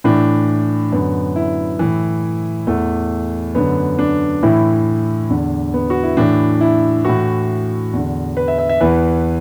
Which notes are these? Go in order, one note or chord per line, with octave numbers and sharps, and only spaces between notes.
A2 E3 D4
F#2 D3 B3
E4
A2 E3
E2 E3 A3
F#2 D3 B3
D4
A2 E3 E4
E2 D3 D4
B3
F#4
E4
A2 E3 D4
E4
A2 E3 F#4
E2 D3
B4
E5
E5
E5
E2 E3 B4